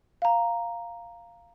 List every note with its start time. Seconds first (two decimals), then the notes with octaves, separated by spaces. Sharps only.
0.22 F5 A#5